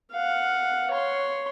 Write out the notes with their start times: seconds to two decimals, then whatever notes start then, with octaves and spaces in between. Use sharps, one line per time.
0.12 F5 F#5
0.91 C#5 C6